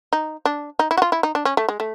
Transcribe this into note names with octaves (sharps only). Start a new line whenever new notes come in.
D#4
D4
D#4
E4
F#4
F4
E4
D#4
D4
C#4
A3
G#3
A3